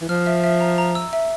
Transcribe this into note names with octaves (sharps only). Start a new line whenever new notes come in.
E3
F3 F6
E5
E5
A#5
A#5
E6
E5